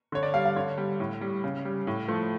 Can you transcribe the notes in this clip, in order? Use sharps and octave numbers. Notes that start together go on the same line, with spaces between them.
D3 C#5
D5
G3 F5
F5
D3 C#5
G3
A2
G3
C#3
G3
A2
F3 A3